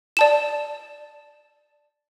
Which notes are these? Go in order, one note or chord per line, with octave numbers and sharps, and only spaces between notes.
D5 A5 E7